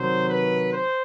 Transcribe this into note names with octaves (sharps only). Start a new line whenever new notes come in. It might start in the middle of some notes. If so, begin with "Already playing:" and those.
Already playing: C3 D#3 F#3 C5
B4
C5